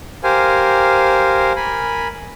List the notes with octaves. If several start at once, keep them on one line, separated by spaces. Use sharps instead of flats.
G4 A#4 C5 F5 G#5
A#4 G#5 B5